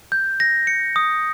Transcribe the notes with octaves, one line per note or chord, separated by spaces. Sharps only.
G6
A#6
C#7
D#6